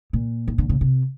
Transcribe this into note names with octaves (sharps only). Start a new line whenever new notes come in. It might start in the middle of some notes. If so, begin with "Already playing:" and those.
A#2
D#3
D3
C#3
C3